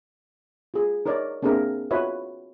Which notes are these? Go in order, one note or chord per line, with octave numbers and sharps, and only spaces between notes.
F4 G#4
D#4 A#4 C#5 D5
A#3 C4 D4 G#4 A#4 E5
F4 F#4 B4 C#5 D#5 E5